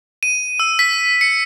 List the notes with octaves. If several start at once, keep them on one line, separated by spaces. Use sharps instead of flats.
D#7
E6
B6
C#7